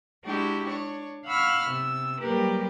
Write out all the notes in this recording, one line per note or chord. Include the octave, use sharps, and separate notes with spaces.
G#3 D4 E4 F#4 G4
D4 C#5
F5 F#5 B5 C#6 E6 F6
C3 B3 E6
F#3 G3 A#3 G4 A#4 B4